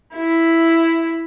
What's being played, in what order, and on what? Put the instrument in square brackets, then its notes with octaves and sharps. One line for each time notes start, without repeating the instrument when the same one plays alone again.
[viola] E4